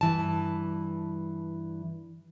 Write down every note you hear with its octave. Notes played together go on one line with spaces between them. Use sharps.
G2 E3 A5